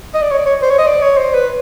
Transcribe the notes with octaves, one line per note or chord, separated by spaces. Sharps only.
D#5
D5
C#5
D5
C#5
C5
C#5
D#5
D5
C#5
C5
B4